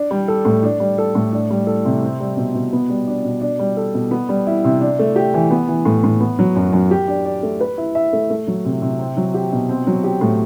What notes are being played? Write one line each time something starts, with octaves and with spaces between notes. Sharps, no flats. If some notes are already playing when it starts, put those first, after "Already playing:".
Already playing: D4
G3
A4
A2
D4
G3
A4
A2
D4
G3
A4
C3
C4
G3
B2
B2
B3
G3
D4
B2
D4
G3
A4
B2
B3
G3
E4
C3
D4
A3
G4
E3
B3
E3
A2
A2
B3
F#3
F#2
F#2
G4
D4
D5
A3
B4
E4
E5
A3
A3
F#3
C3
C3
C4
F#3
G4
B2
C4
F#3
G4
A2